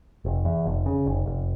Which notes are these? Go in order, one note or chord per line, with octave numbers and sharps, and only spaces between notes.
F1
E2
F1
C#3
F1
F1